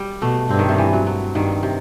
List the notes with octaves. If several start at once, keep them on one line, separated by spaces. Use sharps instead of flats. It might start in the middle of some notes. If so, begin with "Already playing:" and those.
Already playing: G3
B2 A3
G2 C4
D#3
C3
E3
F#3
F#3
G2 D#3
C3